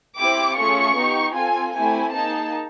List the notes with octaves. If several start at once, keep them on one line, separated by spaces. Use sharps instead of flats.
C4 E4 G4 D6
A3 C#4 F4 G#4 C#6
B3 D#4 G4
C4 F4 A4 G#5
A3 C4 E4 G4 G#5
A#3 D#4 G#4 A5